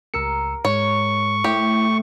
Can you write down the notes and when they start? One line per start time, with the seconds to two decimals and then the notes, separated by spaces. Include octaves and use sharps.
0.14 C#2 A#4 E6 C#7
0.65 G#2 G#3 C#5 C#6
1.44 A2 E4 G4